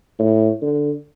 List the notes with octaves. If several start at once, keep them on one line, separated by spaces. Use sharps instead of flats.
A2
D3